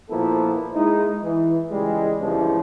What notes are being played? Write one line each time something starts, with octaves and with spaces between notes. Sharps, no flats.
A#2 F3 A#3 B3 E4 A4
G#3 D#4 E4
E3
C#2 E3 G3 G#3
E2 G2 C#3 E3 F3 G#3